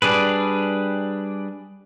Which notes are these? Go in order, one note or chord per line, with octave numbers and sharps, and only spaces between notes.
G3 D4 G#4 B4